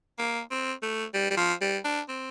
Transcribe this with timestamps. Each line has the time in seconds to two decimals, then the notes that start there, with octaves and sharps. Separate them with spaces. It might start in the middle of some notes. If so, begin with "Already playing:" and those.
0.19 A#3
0.51 C4
0.83 A3
1.14 G3
1.31 G3
1.37 F3
1.62 G3
1.85 D4
2.09 C4